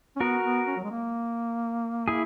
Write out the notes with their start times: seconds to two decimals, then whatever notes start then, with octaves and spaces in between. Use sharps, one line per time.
0.16 C#4
0.20 B3 F#4 A#4
0.44 B3
0.67 C#4
0.77 F#3
0.84 G#3
0.91 A#3
2.08 E4 G#4